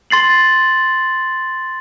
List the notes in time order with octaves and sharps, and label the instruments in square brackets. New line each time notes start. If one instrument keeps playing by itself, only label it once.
[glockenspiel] C6 A6 C7 F#7